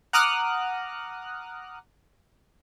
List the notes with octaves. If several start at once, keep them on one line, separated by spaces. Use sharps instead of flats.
F#5 A#5 D6 D#6 F6 F#6